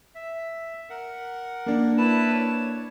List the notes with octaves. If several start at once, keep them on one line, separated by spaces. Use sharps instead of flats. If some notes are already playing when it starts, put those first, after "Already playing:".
E5
A#4 F#5
A#3 D4
E4 B4 A5
C#5